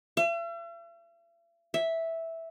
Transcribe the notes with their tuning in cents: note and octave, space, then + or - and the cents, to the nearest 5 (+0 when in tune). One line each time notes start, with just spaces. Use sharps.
E5 +45
E5 -5